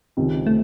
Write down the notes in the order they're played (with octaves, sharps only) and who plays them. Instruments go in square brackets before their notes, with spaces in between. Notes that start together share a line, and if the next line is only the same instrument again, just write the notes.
[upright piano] C#2 C3 D#3
[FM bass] A3